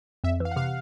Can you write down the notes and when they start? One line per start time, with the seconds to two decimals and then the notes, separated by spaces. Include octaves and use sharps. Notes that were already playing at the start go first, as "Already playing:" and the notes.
0.24 F2 E5
0.40 E3 F5
0.51 F#5
0.56 C3 F5